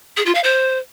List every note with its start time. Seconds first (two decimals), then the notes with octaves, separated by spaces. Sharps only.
0.17 G#4
0.26 F4
0.35 F5
0.43 C5